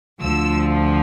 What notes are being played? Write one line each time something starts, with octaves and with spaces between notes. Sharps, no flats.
D2 D3 F3 E6